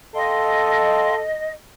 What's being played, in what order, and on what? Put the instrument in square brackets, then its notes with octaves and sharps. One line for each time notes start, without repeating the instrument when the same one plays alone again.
[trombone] A4 [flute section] D#5 [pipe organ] F5 G5 C6